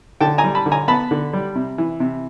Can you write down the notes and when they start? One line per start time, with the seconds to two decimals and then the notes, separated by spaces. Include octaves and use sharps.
0.21 D3 G5 A5
0.38 G#5 A#5
0.44 G3
0.55 A5 B5
0.66 D3
0.72 G#5 A#5
0.88 B3 A5 B5
1.11 D3
1.33 G3
1.55 C3
1.78 E3
2.00 C3